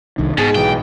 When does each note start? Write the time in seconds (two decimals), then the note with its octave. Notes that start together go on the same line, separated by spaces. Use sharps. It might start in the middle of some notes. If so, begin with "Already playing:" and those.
0.18 C2 D#3 D4
0.38 G#2 B2 G#4
0.55 B1 E3 G5